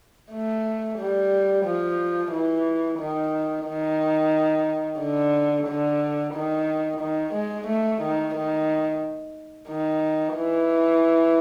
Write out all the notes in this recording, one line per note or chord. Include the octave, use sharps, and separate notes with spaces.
A3
G3
F3
E3
D#3
D#3
D3
D3
D#3
D#3
G#3
A3
D#3
D#3
D#3
E3